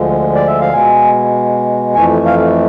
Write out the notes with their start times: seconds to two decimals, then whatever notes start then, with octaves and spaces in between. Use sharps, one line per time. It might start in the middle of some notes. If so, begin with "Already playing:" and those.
Already playing: D2 D3 F3 G#3
0.35 D5
0.47 E5
0.61 F5
0.73 B2 G#3 G#5
1.95 F2 E3 A3 G#5
2.26 F5